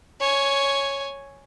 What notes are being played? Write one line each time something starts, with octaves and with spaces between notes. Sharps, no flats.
C#5 G#5